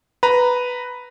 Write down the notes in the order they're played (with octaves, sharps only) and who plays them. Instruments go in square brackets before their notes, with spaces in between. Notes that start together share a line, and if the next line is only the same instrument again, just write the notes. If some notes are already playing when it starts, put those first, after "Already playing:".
[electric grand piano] B4 A#5